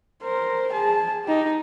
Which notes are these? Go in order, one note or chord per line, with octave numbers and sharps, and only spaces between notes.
A#4 C5
G#4 A5
D#4 G4